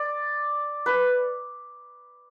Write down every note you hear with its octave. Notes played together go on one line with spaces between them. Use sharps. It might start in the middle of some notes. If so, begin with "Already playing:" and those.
Already playing: D5
B4